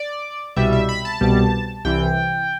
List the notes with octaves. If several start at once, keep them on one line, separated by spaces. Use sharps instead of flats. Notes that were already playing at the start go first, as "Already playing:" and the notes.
Already playing: D5
C2 B2 G3 E5
E5
B5
A5
C2 B2 G3
C2 C3 E3 G5